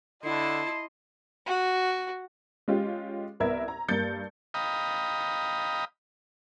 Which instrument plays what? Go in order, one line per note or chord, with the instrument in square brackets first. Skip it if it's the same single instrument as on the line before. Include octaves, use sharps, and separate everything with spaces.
[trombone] D3 [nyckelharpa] E4 A5 [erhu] D#5 [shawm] C6
[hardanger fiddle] F#4
[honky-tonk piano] G#3 C#4 F4 G4
C2 B3 A#4 E5 E6 G#6
A#5
G2 A#3 G6 A6 C#7
[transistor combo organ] D#5 F5 G5 A#5 B5 D#6